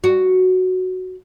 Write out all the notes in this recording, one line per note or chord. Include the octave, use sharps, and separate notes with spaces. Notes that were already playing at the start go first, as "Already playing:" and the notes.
F#4